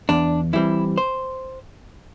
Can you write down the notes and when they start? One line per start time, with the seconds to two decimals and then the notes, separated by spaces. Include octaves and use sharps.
0.09 E2 D4
0.53 E3 G3 C4 E4
0.98 C5